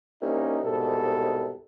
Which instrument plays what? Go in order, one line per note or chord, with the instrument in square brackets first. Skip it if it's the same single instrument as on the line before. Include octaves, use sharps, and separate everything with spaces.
[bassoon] C2 [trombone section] A#3 C#4 D#4
[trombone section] G#2 B2 A4